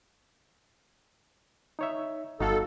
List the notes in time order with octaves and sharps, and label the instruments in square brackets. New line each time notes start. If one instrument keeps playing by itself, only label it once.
[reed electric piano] D#4 C#5 E5
[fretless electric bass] G1 [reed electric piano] D#4 F#4 F5 [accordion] A4